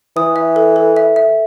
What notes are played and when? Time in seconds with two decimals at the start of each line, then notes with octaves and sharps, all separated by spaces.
0.16 E3 D#6
0.36 E5
0.56 A4
0.76 A4
0.96 E5
1.16 E5